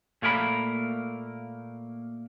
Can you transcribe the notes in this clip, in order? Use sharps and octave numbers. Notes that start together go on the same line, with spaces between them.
A#2 A3 A#3 A#4 C#5 B5